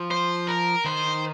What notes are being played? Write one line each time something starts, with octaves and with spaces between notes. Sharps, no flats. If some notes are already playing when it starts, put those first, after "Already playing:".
Already playing: F3
C5
A#4
D#3 C5